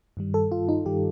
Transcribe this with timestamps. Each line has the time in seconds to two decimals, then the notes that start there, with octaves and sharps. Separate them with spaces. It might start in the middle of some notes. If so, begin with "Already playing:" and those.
0.17 G2 D#3 G3
0.34 A4
0.52 F4
0.69 D#4
0.86 G2 D#3 G3 G4